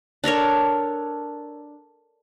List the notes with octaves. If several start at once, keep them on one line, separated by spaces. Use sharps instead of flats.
D4 A4 A#4 C#5